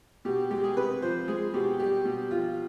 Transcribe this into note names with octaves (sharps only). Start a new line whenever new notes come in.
B2 G4
G#3 G4
G#4
C3 B4
F3 C5
G#3 G#4
B2 G4
G3 G4
B2
F3 F4